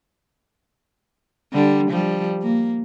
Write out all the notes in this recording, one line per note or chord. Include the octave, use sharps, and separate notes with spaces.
D3 G3
F3 G3
A#3